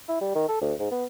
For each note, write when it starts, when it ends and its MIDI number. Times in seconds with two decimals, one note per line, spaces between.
0.09 0.16 64
0.21 0.32 55
0.35 0.48 51
0.49 0.61 69
0.61 0.74 38
0.79 0.88 44
0.91 1.05 59